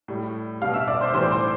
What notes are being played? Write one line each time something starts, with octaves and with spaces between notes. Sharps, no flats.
A2 G3
B2 G3 F5 F6
E5 E6
D5 D6
C5 C6
A2 E3 G3 C5 C6
D6
C5 C6